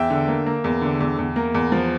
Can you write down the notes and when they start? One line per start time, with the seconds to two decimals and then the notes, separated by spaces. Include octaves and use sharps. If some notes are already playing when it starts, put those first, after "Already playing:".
Already playing: E2 E5 G5
0.10 D3
0.28 A#3
0.46 A#3
0.64 E2
0.82 D3
1.01 E2
1.19 E2
1.36 A#3
1.55 E2
1.72 F3